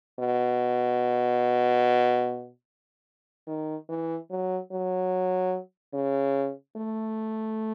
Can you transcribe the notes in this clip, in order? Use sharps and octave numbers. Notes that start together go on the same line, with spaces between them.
B2
D#3
E3
F#3
F#3
C#3
A3